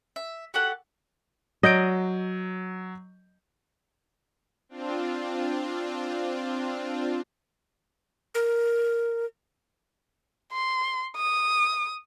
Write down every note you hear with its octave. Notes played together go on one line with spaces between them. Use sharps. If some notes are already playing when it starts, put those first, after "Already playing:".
E5
F#4 G4 A4 F#5
F#3 D#5 G6 D7
C4 D4 F4
A#4
C6
D#6